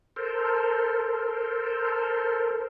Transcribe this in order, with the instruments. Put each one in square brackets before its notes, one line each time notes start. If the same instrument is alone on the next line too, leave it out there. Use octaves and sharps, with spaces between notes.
[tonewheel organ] A4 A#4 C5